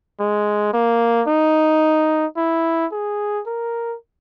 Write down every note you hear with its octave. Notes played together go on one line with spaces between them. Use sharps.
G#3
A#3
D#4
E4
G#4
A#4